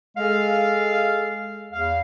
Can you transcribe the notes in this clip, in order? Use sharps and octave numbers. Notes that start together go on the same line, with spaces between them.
G#3 G#4 A4 F5
E2 F5